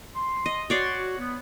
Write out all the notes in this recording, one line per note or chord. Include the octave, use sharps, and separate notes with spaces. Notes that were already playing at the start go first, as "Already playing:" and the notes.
C6
D#5
F#4 C#5 D5 C6
B3